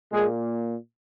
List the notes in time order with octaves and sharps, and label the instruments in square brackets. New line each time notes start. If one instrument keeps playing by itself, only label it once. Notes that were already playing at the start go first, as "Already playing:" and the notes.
[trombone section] A#2 G#3 A#3 G#4